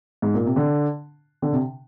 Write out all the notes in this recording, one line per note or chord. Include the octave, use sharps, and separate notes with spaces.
G#2
A#2
C3
D3
D3
C3